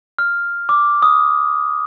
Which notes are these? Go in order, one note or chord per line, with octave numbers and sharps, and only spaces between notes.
F6
D6
D#6